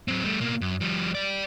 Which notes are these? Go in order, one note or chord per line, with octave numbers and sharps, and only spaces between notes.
F#3 C4
G3 A3
B2 A#3
F#2
F3 G3
G4 D5